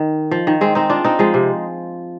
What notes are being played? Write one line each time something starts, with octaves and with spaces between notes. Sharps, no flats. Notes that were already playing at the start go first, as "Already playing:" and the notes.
Already playing: D#3
F3
D#3
G#3 C4
C4 D#4
D4 F4
C4 D#4
F3 G#3
C3